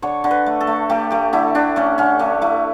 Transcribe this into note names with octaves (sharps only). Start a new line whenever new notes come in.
D3 C#5
D3
B4
A3
A4
A3
A3 G4
A3 G4
D3 E4
D3 D4
A3 C#4
D3 C#4
A3 D4
A3 E4